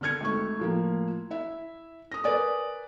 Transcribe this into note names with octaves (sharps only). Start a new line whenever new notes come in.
D3 D4 F6 G#6 C#7
G#1 A3 C#6
A2 F3 A#3
E4 E5
D#6 A#6
A#4 B4 D5 G#5 D#6